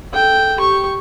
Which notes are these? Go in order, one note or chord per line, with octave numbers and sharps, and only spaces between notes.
A4 G5
G4 C#6